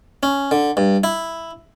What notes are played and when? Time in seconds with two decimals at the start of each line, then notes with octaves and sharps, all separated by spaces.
0.23 C#4
0.51 D3
0.77 G2
1.04 E4